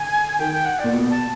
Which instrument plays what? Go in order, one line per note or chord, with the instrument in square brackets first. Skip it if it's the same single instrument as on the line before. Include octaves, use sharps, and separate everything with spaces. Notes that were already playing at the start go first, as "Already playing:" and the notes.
Already playing: [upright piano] D3 [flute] G#5
[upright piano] D#3 [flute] G5
[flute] G5
F#5
D5
[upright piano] A#2
B2
[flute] A5